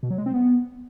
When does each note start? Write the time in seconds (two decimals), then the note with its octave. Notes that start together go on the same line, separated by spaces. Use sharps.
0.03 B2
0.10 F#3
0.18 G#3
0.26 C4
0.34 B3